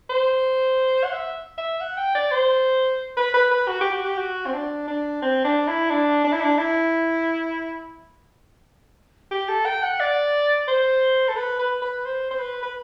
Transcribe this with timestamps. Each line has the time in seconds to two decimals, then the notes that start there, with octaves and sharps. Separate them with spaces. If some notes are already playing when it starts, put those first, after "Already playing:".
0.10 C5
1.04 F#5
1.12 E5
1.58 E5
1.81 F#5
1.97 G5
2.15 D5
2.32 C5
3.17 B4
3.34 B4
3.51 B4
3.68 F#4
3.81 G4
3.93 F#4
4.05 G4
4.18 F#4
4.46 C4
4.54 D4
4.88 D4
5.22 C4
5.44 D4
5.68 E4
5.90 D4
6.25 D4
6.33 E4
6.41 D4
6.58 E4
9.31 G4
9.49 A4
9.66 G5
9.83 F#5
10.00 D5
10.68 C5
11.28 A4
11.36 B4
11.59 B4
11.82 B4
12.05 C5
12.31 C5
12.39 B4
12.63 B4